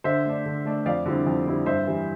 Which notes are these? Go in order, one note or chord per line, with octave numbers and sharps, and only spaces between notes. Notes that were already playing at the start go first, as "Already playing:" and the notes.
D3 C5 E5
A3 D4
D3
A3 D4
F2 D5 F5
D3 G3 C4 E4
F2
D3 G3 C4 E4
G2 C5 E5
E3 G3